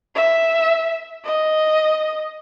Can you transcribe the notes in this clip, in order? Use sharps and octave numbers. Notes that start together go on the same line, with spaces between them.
E5
D#5